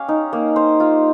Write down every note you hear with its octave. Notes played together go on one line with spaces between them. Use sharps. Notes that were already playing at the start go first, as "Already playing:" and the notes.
Already playing: C#4 G4 F5
D#4
A#3
C5
F4